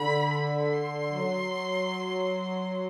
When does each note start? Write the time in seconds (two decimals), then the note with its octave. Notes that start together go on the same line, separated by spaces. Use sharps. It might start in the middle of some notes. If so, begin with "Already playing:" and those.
Already playing: D3 B5
0.33 B5
0.73 C6
1.12 F#3